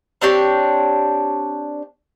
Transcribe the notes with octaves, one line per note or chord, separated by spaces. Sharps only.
C4 D4 G4 C#5